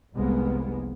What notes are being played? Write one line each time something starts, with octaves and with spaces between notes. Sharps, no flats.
F1 C2 G#3 A#3 B3